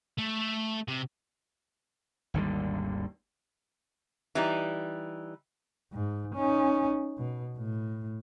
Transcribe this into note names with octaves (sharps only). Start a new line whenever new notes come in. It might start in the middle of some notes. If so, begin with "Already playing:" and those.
A3
C3
G#1 D#2 D3 G3
E3 G3 D#4
G#2
C#4 D#4
B2
A2